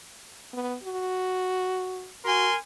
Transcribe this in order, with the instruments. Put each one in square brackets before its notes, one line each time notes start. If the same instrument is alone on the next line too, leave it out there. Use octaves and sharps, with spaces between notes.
[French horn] B3
F#4
[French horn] F#4 [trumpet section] A#4 G#5 C6